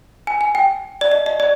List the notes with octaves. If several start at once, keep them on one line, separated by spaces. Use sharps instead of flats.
G#5
G#5
G5
D5
D#5
D#5
D5